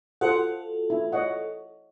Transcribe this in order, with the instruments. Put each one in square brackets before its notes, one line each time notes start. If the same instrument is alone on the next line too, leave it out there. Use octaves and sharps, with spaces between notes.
[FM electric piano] F4 F#4 A4 [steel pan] C5 F#5
[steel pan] E4
C#5 D#5 F#5